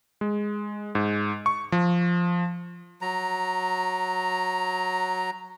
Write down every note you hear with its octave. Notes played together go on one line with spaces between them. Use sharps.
G#3
G#2
C#6
F3
F#3 A#5